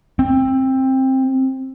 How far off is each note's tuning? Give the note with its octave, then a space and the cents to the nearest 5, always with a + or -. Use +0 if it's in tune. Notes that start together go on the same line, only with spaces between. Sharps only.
C4 +15